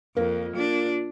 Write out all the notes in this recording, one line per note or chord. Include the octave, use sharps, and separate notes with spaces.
F2 A#3
A#2 D4